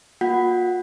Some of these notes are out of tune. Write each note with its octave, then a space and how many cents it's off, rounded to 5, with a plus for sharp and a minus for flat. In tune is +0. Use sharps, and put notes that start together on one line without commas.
A#3 +25 F4 +40 F#5 +10